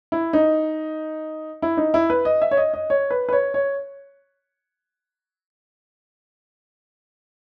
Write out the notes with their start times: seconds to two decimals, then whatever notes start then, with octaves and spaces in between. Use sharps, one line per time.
0.12 E4
0.33 D#4
1.62 E4
1.77 D#4
1.94 E4
2.10 B4
2.25 D#5
2.42 E5
2.51 C#5
2.57 D#5
2.74 D#5
2.90 C#5
3.10 B4
3.29 B4
3.33 C#5
3.54 C#5